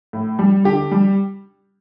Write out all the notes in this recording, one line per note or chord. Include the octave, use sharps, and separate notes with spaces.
A2
G3
D3 G4
G3